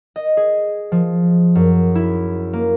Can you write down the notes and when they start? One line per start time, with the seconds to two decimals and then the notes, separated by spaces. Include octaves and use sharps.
0.16 D#5
0.37 G#4
0.92 F3
1.55 F#2
1.95 E4
2.53 A#3